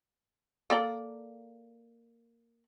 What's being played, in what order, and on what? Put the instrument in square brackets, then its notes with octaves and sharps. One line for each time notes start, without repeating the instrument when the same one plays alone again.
[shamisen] A#3 A4 D5